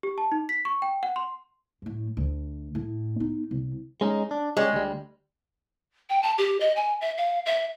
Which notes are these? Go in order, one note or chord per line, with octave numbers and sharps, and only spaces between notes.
G4
A5
D#4
B6
C#6
G5
F#5
C6
F#2 A2
D2
A2
B3 D#4
C2
G#3 C#4 D#4
D4
G3 G#3 C#4
D2 G3
G5
A5
G4
D#5
G#5
E5
F5
E5